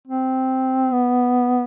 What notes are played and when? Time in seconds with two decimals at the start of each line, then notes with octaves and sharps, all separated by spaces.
0.08 C4
0.92 B3